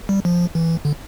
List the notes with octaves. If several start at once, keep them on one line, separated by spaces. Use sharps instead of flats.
G3
F3
E3
D3